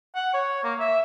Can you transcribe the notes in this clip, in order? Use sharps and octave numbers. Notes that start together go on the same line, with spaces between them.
F#5
C#5
A#3
E5